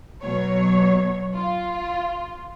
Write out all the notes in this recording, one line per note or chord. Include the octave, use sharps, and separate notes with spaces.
B2 F#3 C#5
F4